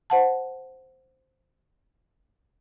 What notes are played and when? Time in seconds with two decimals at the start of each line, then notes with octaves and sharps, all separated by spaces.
0.10 C5 F#5 A5